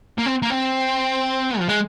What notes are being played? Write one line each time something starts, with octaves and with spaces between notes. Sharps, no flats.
A#3
C4
A#3
C4
F3
G#3